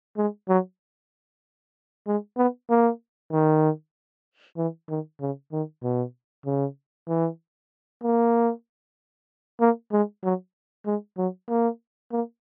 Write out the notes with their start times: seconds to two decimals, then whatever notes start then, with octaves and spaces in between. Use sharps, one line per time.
0.18 G#3
0.49 F#3
2.07 G#3
2.37 B3
2.70 A#3
3.32 D#3
4.57 E3
4.89 D#3
5.21 C#3
5.52 D#3
5.84 B2
6.46 C#3
7.08 E3
8.03 A#3
9.60 A#3
9.92 G#3
10.24 F#3
10.86 G#3
11.18 F#3
11.49 A#3
12.12 A#3